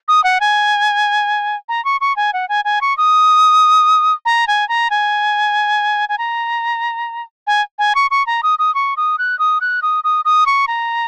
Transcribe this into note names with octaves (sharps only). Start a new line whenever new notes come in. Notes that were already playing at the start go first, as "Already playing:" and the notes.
D#6
F#5
G#5
A#5
C#6
C#6
G#5
F#5
G#5
G#5
C#6
D#6
A#5
G#5
A#5
G#5
G#5
A#5
G#5
G#5
C#6
C#6
A#5
D#6
D#6
C#6
D#6
F#6
D#6
F#6
D#6
D#6
D#6
C#6
A#5